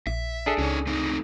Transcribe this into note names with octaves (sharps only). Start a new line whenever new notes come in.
A#1 E5
D4 G#4 A4
C#2 C#4 D#4 C#5
A3 C4 D#4